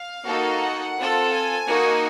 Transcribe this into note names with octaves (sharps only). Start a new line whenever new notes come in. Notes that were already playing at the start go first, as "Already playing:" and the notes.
Already playing: F5
A#3 D#4 F#4 A4
F#5
C4 F4 A4
G#5
A#3 D#4 F#4